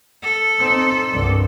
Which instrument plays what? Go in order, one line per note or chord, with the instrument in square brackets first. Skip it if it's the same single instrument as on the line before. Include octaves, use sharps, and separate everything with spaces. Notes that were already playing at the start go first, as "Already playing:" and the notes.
[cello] A4
[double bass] C4 D#4
C2 G2